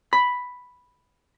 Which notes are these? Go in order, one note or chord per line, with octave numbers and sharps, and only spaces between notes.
B5